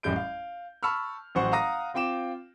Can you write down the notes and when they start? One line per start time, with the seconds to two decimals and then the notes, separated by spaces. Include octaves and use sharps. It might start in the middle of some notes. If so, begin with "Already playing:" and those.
0.03 A1 F#2 G3 G6 D7
0.16 F5
0.83 A5 B5 C#6 E6 F6
1.35 A1 F#3 C5 F#5 C#6
1.52 F5 F#5 A#5 D#6 A#6
1.94 C4 F4 G5 D6 E7